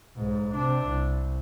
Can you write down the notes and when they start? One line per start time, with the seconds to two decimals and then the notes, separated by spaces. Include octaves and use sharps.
0.17 B1 G#2
0.55 C3 D4
0.86 C2